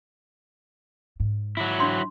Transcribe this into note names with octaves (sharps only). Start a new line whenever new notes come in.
G#2
F#3 E4
D4 C6